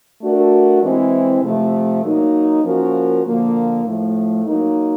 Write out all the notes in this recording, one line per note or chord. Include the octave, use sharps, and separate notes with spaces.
A3 D4 F#4 A#4
E3 G#3 C4 E4
C3 F3 A3
F#3 A#3 D#4
F3 A#3 C#4 F#4 A#4
D3 F3 A#3
A2 F3 A3
F#3 A#3 D#4